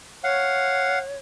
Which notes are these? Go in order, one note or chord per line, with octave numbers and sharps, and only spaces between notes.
C#5 F5 F#5